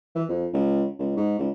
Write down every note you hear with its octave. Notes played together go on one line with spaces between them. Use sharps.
E3
F2
C#2
C#2
G#2
C#2